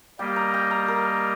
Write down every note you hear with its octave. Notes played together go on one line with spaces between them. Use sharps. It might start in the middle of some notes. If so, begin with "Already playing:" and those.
G3 A#3 G4 D#5 G5
A#5
G5
A#5
A#4